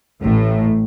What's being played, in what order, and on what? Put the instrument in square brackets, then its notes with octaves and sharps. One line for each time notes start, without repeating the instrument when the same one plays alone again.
[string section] A1 A2